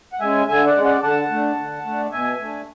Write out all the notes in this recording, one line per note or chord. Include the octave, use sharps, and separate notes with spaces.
F#5
G#3 C#4 E5 G#5
D3 E5 G#5
D5 F#5
G#3 C#4
D5 F#5
D3 F#5 A5
A3 D4
D3
A3 D4
B2 E5 G#5
A3 D4